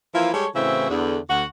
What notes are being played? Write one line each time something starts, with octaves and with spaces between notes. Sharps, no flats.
E3 F3 A#3 E4 F4
G3 G#3 A4 C#5
A2 C#3 E3 C4 F#4 E5
E2 D3
D2 F#4